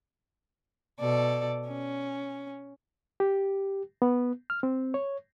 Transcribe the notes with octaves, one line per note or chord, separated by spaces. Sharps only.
B2 A4 D5
C#4
G4
B3
F6
C4
C#5